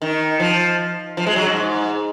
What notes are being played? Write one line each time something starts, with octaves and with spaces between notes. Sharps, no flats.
D#3
F3
F3
G#3
F#3
G#2
G#2